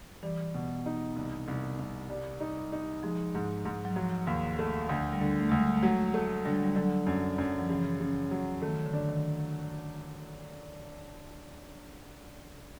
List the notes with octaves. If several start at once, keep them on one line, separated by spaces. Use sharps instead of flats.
E3 G3
B2
D#4
C2
C2
C2
G3
D#4
D#4
F3 G#3
G#2
G#2
F#3
F3 F#3
D#2
A3
D2
G3
D3
A3
D2 G#3
G3
A3
F#3 G#3
A3
D3 G3
F#3
G3
D3 F#3
F#2
F#2
F3
C#3 E3
C#3
F#3
D#3 A3
D3
D4
D#3